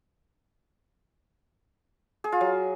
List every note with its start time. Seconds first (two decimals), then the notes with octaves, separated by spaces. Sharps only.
2.24 G#4
2.32 F4
2.41 F#3